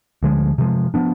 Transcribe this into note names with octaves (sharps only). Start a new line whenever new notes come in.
D2 D3 F3 G#3
C3 F3 G#3
F3 B3 D4